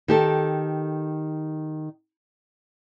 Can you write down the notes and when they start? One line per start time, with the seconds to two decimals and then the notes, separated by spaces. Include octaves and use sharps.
0.08 D#3 G4 A4